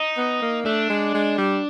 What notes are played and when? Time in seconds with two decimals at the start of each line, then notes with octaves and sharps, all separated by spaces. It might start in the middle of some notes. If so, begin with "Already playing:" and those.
Already playing: D#4
0.17 B3
0.42 A#3
0.65 A3 D4
0.90 G#3
1.14 G#3
1.38 G3